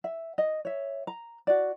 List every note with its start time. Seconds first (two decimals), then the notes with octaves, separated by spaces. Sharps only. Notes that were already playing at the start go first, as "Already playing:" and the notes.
0.04 E5
0.38 D#5
0.65 C#5 E5
1.07 A#5
1.47 F#4 D5